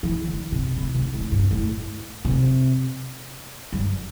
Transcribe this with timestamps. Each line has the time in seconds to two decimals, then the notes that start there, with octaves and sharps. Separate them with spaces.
0.03 E3
0.27 D3
0.52 C3
0.77 C3
0.94 C3
1.14 A2
1.32 G2
1.51 A2
2.25 C3
3.73 G2